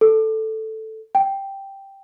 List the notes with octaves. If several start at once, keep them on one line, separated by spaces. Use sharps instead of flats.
A4
G5